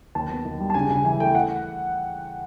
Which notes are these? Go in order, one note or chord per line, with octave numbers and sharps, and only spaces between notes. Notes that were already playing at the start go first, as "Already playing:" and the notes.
D#2 A5
B3
D#3
G3
A5
C#3 G#5
C#3 G#5
E3 G#5
A3 G5
F#5